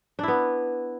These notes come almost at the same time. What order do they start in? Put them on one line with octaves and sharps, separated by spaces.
D4 E4 B3